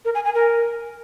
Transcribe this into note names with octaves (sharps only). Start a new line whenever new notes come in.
A#4
G#5
G#5
A#4